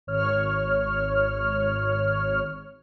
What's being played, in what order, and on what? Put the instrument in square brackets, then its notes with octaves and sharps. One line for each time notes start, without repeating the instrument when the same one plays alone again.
[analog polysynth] G#1 C#5 F6